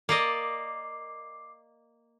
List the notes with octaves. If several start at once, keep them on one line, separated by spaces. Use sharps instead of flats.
A#3 D5 D#5 D6 C7